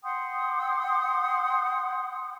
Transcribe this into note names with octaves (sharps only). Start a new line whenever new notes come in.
F#5 G5 C6 D#6